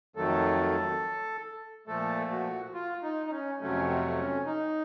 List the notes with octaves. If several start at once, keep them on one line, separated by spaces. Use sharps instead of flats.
F2 D#3 F#3 A3 A4
A#2 F3 A3 A4
F#4
F4
D#4
D#4
C#4
F2 C3 F#3 A3 C#4
C4
C#4
D#4